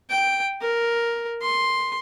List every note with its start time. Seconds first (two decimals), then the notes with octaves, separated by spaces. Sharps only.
0.10 G5
0.62 A#4
1.42 C6